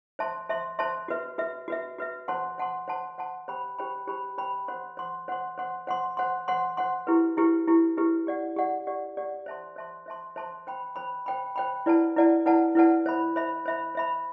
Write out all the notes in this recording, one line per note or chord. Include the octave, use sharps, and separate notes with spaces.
C5 E5 A5 C6
C5 E5 A5 C6
C5 E5 A5 C6
F#4 B4 E5
F#4 B4 E5
F#4 B4 E5
F#4 B4 E5
C5 F#5 A5 C6
C5 F#5 A5 C6
C5 F#5 A5 C6
C5 F#5 A5 C6
G4 C5 G5 B5
G4 C5 G5 B5
G4 C5 G5 B5
G4 C5 G5 B5
C5 F#5 C6
C5 F#5 C6
C5 F#5 C6
C5 F#5 C6
C5 F#5 C6
C5 F#5 C6
C5 F#5 C6
C5 F#5 C6
E4 G4 B4
E4 G4 B4
E4 G4 B4
E4 G4 B4
G4 D5 F#5
G4 D5 F#5
G4 D5 F#5
G4 D5 F#5
C5 E5 A5 C6
C5 E5 A5 C6
C5 E5 A5 C6
C5 E5 A5 C6
C5 G5 B5
C5 G5 B5
C5 G5 B5
C5 G5 B5
E4 B4 D5 F#5 A5
E4 B4 D5 F#5 A5
E4 B4 D5 F#5 A5
E4 B4 D5 F#5 A5
C5 E5 B5
C5 E5 B5
C5 E5 B5
C5 E5 B5